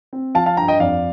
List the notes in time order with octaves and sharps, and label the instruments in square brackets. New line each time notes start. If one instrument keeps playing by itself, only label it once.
[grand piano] C4
F3 F5 A5
F5 A5
G2 G5 A#5
D#5 G5
F2 D5 F5